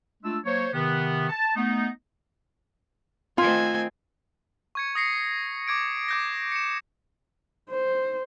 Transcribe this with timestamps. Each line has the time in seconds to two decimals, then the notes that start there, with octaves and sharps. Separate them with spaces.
0.23 G#3 A3 D4 F4 E6
0.44 F#3 A#3 C5 C#5
0.73 C3 D#3 B3
1.29 A5
1.56 A3 B3 D#4
3.38 D#3 A3 C4 F4 G#5
4.75 C#6 G#6 C#7
4.95 D#6 A#6 C7 C#7
5.67 D6 G#6 D7
6.08 D6 G6 A#6
6.52 C#7 E7
7.70 C5